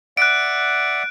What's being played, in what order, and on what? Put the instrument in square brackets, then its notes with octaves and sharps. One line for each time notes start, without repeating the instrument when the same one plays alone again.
[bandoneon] D5 E5 F#5 [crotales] F#6 D7